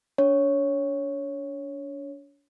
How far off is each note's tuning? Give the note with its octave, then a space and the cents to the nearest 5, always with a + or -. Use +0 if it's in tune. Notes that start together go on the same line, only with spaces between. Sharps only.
D4 -40 C#5 +0